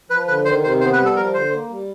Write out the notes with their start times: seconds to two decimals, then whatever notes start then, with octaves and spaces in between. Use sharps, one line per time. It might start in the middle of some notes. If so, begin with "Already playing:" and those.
0.10 F3 B4
0.27 D3 B4
0.45 D#3 C5
0.62 C3 C5
0.81 B3 C5
0.93 B4
0.98 G3
1.05 A4
1.16 F3 A#4
1.34 D3 C5
1.51 A#3
1.70 G3